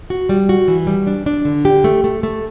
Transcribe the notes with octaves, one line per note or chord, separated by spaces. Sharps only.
F#4
G3
F#4
E3
G3
D4
D4
D3
G4
A3
A3
A3